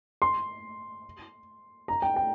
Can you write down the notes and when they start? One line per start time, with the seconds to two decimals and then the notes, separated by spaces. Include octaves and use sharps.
0.22 C6
1.88 A#5
2.02 G5
2.16 G5